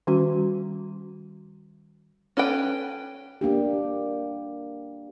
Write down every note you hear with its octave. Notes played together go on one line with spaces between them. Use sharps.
D#3 G3 C#4 F#4
C#4 A4 B4 G5
A#3 D4 G4